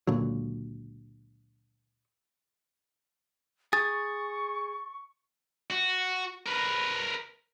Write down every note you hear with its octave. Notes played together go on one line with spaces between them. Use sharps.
C#2 A#2 D3 F#3
G#4 C#6 A6
F#4
A#4 B4